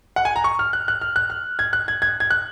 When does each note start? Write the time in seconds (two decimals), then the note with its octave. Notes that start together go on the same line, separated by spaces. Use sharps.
0.16 F#5
0.25 G#5
0.36 A#5
0.44 C#6
0.59 F6
0.73 F#6
0.88 F#6
1.01 F6
1.16 F#6
1.30 F6
1.59 G#6
1.73 F#6
1.88 G#6
2.02 G#6
2.20 G#6
2.30 F#6